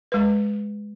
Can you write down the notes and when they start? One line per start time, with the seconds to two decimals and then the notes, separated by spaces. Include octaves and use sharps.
0.12 G#3 B4